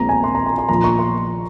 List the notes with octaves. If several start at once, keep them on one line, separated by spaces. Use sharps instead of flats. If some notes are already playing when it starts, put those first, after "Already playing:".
Already playing: A#1 A#2 G#3 C4 A#5
G#5
C6
A#5
C6
C6
A#1 A#2 F3 A#5
C#6
C6